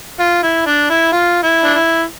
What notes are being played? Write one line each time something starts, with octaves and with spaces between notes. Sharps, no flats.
F4
E4
D4
E4
F4
E4
D4
E4